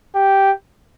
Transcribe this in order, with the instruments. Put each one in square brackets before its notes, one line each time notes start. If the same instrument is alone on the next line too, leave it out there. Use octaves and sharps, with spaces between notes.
[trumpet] G4